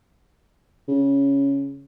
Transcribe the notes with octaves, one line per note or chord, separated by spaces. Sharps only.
C#3